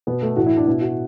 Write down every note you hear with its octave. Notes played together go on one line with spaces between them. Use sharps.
B2 B3
A3
A2 E3 F#4
E4
D4
B2 E4
F#4